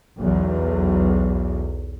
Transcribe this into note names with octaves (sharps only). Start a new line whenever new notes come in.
B1 E2